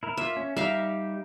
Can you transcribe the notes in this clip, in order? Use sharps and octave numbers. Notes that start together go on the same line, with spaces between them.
E4 A#4
A#3 F4 E5
C#4
G3 D#4 G4 E5 F5